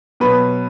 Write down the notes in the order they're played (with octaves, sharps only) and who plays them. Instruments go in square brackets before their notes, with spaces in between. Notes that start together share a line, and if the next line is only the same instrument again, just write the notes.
[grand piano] B2 F#3 B4